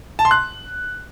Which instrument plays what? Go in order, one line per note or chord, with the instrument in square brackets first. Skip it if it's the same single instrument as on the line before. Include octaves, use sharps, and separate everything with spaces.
[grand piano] A5
C6
F#6